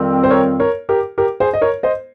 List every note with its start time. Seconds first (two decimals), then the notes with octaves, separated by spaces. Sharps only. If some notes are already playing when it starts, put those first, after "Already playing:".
Already playing: F2 D#3 G3 C4 F4
0.24 C5
0.30 A#4 C#5
0.60 A#4 C#5
0.89 G4 A#4
1.18 G4 A#4
1.40 G#4 C5
1.53 D#5
1.62 A#4 C#5
1.83 C5 D#5